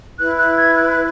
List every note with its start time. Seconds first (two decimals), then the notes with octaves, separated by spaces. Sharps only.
0.18 E4 B4 F#6
0.38 F#6
0.57 G#6
0.76 F#6
0.91 F#6